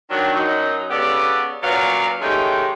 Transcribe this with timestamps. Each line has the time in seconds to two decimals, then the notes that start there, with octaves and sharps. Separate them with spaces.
0.10 D#3 F#3 D4
0.34 F#2 F#3 D#4
0.91 C#3 B3 G4 A4 D5
1.63 A#2 F#3 B3 C#4 D5 F5
2.21 D#3 G#3 A3 C#4 D#4 G4